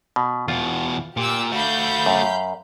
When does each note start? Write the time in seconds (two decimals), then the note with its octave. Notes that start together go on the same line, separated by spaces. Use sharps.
0.16 B2
0.48 E2 B2 F4
1.17 A#2 G4 E6
1.52 A3 F#4 F5 B5 G6
2.06 F#2